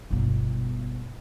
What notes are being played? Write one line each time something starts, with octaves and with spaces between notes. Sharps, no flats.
G1 B2